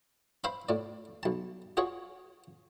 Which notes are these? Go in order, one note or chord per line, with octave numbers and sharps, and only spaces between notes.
C5 E5 F5 B5
A2 D5
B1 A5
F4 F#4 G#4 C#5